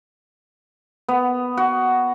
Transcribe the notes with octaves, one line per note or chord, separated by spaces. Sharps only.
B3
F#4